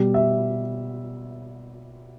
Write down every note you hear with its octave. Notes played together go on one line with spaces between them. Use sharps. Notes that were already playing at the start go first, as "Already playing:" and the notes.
Already playing: B2 G3
E5